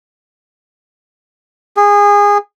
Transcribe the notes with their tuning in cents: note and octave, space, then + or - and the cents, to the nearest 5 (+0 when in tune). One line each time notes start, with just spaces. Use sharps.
G#4 -25